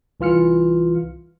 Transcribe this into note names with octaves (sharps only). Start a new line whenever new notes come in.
C2 E3 F4 F6 C#7